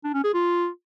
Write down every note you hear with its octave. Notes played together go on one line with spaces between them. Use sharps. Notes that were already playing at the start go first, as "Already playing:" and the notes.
D4
C#4
G#4
F4